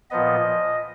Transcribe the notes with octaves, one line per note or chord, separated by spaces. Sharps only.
A#2 F3 B3 D#5